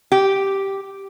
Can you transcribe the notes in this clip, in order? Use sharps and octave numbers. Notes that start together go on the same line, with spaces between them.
G4